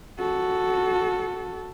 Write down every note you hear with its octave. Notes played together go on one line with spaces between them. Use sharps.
F#4 A4